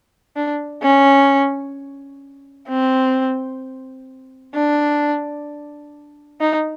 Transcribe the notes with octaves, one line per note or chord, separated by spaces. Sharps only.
D4
C#4
C4
D4
D#4